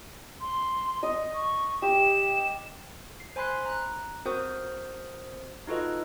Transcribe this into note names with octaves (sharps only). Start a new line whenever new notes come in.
C6
D#5 D#6
C#6
G4 E7
C7
C5 G#5 B5 C6 F#6 C7
A#5 F#6
C4 F#4 A#4 C5 D#6 G6
D#4 F4 F#4 A4 B4 D#5